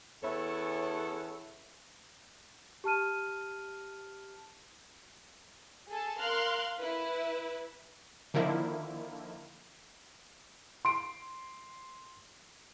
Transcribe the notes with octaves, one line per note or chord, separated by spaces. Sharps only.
E2 B3 C#4 E4 A4 C#5
G4 A5 F6 D#7
G#4 A4 A5
A#4 F5 C6 F6 F#6
E4 B4
D3 D#3 F3 A#3 E4
C6 D7